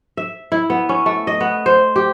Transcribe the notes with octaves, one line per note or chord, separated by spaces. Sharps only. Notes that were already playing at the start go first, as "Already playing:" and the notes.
E5
E4
B3
C#4
A3
D#5
B3
C5
G4